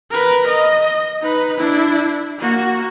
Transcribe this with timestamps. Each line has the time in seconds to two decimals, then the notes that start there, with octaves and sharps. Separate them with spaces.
0.11 A#4 B4
0.48 D#5
1.22 D#4 B4
1.58 D4 E4
2.39 A#3 F#4